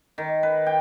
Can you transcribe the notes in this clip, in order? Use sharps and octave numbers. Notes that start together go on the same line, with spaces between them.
D#3
B4
G5